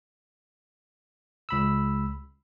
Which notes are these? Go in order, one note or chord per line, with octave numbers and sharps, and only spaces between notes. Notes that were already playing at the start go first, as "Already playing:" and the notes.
C#2 B5 E6